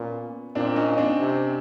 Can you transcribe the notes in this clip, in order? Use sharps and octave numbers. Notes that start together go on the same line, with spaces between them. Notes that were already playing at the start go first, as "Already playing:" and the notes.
Already playing: A#2 B3 C#4
A#2 C4 D4
C#4 D#4
C4 D4
C3